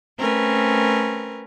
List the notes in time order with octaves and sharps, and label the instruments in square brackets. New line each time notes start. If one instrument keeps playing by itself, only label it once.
[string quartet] A3 C4 C#4 A#4 B4